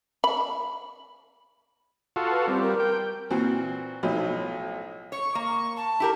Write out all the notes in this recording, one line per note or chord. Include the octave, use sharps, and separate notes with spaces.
B5
F4 F#4 A4
B4
G3 C4
A#4
G5
A#2 E3 C4 F#4
B1 A2 F3 F#3 D#4
C#5 C#6
A#3
A5
E4 G4 A#4